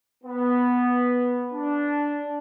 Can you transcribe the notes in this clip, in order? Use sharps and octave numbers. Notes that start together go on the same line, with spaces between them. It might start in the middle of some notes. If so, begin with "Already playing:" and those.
B3
D4